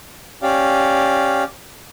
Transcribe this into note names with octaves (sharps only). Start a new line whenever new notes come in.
C#4 G4 D5 F5